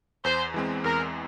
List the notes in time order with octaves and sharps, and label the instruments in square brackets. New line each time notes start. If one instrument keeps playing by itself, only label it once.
[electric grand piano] E2 [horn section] C5
[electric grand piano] E3 G#3 C4
[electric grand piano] E2 [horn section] A#4